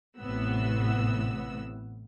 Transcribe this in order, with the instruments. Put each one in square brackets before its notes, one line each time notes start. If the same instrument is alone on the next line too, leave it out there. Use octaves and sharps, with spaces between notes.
[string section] A1 A2 C3 B3 E6